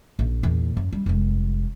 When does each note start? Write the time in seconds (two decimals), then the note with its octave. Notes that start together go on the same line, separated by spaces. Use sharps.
0.19 A#1
0.43 E2 A#2
0.77 F#2
0.92 G3
1.06 F1 G#3